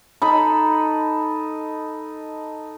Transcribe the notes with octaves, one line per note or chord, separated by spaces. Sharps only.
D#4 A4 B5